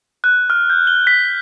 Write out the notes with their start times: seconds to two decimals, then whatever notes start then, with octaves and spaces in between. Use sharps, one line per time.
0.24 F#6
0.50 F6
0.70 G6
0.87 G7
1.07 B6